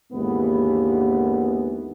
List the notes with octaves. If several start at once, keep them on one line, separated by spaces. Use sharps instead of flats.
D#2 G#2 D3 E3 B3